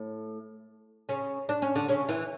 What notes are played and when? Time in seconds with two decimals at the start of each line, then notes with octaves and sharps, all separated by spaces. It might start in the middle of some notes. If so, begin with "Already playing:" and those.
Already playing: A2
1.09 C#3 C#4
1.49 D4
1.62 C#4
1.75 D3 D4
1.88 C#3 C#4
2.09 E3